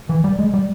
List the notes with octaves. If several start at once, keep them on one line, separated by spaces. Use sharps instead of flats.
E3
G3
G#3
G3